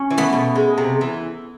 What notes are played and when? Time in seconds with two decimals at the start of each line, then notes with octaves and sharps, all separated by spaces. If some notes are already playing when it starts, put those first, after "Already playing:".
Already playing: C#4
0.11 E3
0.18 A3 B3
0.33 B2
0.56 G#3
0.78 C3
1.01 E3